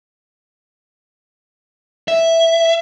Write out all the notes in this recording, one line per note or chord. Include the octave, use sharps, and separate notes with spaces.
E5